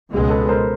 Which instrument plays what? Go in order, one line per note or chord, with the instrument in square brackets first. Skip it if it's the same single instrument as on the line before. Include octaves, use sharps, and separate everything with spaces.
[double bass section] C#2 B2 G#3
[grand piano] A4 B4
A#4 C5